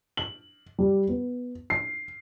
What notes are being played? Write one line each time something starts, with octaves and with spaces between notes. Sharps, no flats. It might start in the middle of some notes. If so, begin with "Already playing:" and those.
F#7
G3
B3
C7